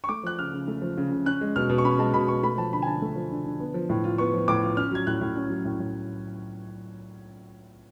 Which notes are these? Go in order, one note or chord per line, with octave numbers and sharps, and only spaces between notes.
C#6
A3 D6
F3 F#6
C#3 F6
C#3
A3
F3
C#3
C#3
C#4 F#6
G#3
B2 F6
B2
C#6
C#4 B5
G#3 A5
B2 B5
B2 C#6
A3 B5
F3 A5
D3 B5
G#5
D3 A5
A3
F3
D3
D3
B3
F3
A2
F4
B3 C#6
F3
A2 D6
F4
C#4 F6
F#3 G#6
A2 F#6
A2
C#4
F#3
A2
A2